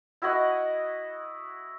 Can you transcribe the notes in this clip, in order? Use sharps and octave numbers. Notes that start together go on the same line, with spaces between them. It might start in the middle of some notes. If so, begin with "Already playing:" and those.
E4 F#4 D#5 F#5